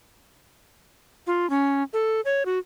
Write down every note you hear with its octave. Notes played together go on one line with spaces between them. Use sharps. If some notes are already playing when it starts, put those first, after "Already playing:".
F4
C#4
A4
C#5
F#4